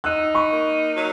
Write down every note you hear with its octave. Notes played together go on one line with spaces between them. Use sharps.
D#4 E6 F#6
B5 C#6
A#3
F#3